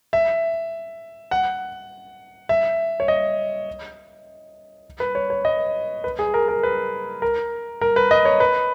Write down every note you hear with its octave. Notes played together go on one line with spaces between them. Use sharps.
E5
F#5
E5
C#5
D#5
B4
C#5
C#5
D#5
B4
G#4
A#4
A#4
B4
A#4
A#4
B4
D#5
C#5
B4